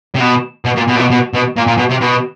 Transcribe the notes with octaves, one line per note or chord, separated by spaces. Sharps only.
C3
B2
B2
A#2
B2
A#2
B2
B2
B2
A#2
A#2
B2
C3
B2